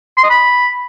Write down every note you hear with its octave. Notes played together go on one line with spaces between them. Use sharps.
C6
D#5
B5